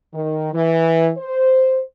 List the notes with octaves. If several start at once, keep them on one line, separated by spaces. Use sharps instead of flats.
D#3
E3
C5